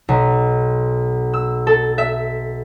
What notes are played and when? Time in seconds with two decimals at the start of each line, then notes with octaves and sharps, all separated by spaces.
0.09 B1
1.34 E6
1.67 A4
1.98 E5